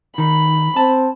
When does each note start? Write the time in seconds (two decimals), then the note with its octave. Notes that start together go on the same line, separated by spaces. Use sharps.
0.18 D#3 B5
0.76 C4 A5